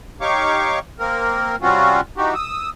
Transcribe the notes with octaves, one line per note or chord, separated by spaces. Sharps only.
D#4 G4 C#5 F5 C#6 D6
A#3 C4 A#4
C3 G3 C4 C#4 F4 F#4
E3 D#4 F#4 G4
D#6 E6